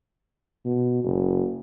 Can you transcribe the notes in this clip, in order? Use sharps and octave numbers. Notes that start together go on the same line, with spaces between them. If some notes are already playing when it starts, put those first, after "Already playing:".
B2
F#1